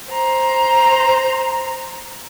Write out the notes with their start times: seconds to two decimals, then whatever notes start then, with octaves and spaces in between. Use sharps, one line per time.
0.11 C5 A#5